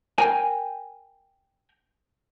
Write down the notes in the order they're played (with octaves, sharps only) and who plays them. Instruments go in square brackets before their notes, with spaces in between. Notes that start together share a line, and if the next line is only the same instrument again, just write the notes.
[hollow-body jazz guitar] A#4 G5 G#5